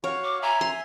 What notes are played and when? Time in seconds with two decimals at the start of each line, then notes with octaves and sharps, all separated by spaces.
0.04 F#4 C#5 F5 C#6
0.24 D6
0.42 E5 G#5 A#5
0.61 C6